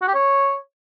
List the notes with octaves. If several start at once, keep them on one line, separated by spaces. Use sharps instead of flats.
F#4
G4
C#5